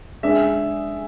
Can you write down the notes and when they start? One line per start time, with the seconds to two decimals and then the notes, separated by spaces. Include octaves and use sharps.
0.23 G#3 D4 G#4 E5